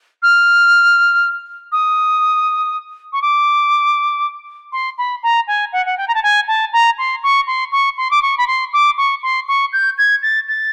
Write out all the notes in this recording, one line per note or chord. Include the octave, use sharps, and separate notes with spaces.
F6
D#6
C#6
D6
C6
B5
A#5
G#5
F#5
F#5
G5
A#5
A5
G#5
A5
A#5
C6
C#6
C6
C#6
C6
D6
C#6
B5
C6
D6
C#6
C6
C#6
G6
G#6
A6
A6